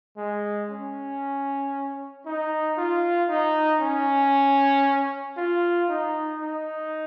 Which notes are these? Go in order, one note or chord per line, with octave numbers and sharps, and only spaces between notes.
G#3
C#4
D#4
F4
D#4
C#4
F4
D#4
D#4